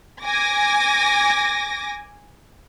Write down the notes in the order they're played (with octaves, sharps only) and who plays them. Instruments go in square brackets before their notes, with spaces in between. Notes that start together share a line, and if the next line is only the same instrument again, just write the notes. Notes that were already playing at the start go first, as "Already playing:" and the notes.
[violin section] G#5 D6 A#6